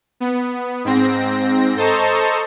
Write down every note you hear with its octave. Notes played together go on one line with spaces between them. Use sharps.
B3
G#2 C4 A#6
A4 C5 D#5 A5 A#5 C#6